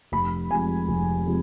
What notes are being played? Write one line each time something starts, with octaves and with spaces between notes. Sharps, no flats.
F1 B5
F2 C3 F3 G#3 G#5
F1
C3 F3 G#3